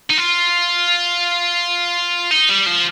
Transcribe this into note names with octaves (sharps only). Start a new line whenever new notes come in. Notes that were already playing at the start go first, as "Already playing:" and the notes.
D#4
F4
D#4
G3
F3